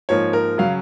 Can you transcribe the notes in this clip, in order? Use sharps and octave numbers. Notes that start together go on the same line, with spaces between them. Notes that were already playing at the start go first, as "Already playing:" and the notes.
G#2 F3 A#3 C#5
A#4
C#3 F#3 C#4 F5